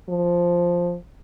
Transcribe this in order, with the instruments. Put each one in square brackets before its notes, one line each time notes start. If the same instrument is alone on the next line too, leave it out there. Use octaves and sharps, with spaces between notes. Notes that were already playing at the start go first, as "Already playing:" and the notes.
[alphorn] F3